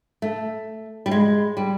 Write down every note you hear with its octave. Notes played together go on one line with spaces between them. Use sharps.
A3
G3
G#3
G3